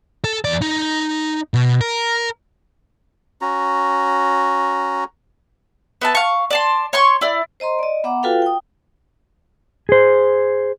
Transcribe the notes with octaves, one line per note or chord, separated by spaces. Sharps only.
A4
E2 D5
D#4
B2
A#4
C#4 F#4 A#5
B3 E5 A5
F5 C#6
D5 A5 C6
C#5 C6 C#6
E4 D5
C5 D#5 A#5 C6
D5 D#5
B3 E5 F#5 A#5 D6
F4 F#4 A4 B4 F5 G5
G5 D#6
G#4 C5